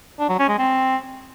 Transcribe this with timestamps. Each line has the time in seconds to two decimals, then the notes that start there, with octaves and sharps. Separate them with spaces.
0.19 D4
0.29 F#3
0.39 C#4
0.49 G#3
0.59 C4